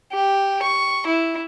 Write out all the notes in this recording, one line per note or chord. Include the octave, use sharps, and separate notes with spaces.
G4
C#6
E4